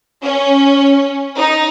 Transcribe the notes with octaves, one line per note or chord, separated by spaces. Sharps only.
C#4
D#4